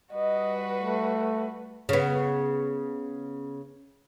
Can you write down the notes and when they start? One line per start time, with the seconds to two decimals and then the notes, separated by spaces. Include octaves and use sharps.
0.13 G3 F#4 B4 D#5
0.81 A3
1.89 C#3 B3